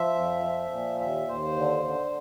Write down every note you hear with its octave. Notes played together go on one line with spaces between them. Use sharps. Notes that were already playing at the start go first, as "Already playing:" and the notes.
Already playing: F3 E5
F2
F3
A#2
D#2 E5
D#2 C5
D3
D3